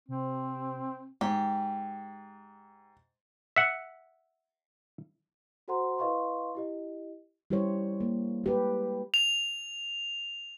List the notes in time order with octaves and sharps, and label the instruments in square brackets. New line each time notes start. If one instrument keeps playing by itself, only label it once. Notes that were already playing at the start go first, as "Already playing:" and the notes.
[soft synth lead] C3 [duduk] C4
[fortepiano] G#2 [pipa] G4
[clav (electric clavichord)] E5 F#5
[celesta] F#4 A4 C5 F#5 A#5 C6
E4 B4 D#5 F5 C6 C#6
E4 G4 D#5
[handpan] G3 E4 G4 C5 C#5
A#3
G#3 G4 B4
[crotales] F7